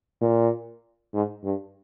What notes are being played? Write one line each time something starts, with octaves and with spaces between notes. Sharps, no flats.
A#2
G#2
G2